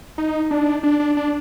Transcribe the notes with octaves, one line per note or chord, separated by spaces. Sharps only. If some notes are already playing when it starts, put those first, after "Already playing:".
D#4
D4
D4
D4
D4